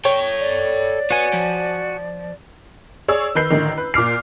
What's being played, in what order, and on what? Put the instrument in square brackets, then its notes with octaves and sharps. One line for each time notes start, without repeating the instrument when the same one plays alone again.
[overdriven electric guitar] A4 G5 [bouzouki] C#5
[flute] D5
[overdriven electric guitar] B3 [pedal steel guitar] F#4 G#5
[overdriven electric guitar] F3
[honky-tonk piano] G#4 C#5 D5 E6
D#3 B4 G6 C7
A1 D3 D#3
B4
A#2 D6 F6 C7